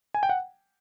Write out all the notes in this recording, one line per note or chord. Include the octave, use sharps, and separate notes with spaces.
G#5
G5
F#5